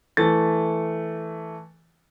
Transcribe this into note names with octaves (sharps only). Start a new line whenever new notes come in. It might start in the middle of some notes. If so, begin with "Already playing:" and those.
E3 A3 A6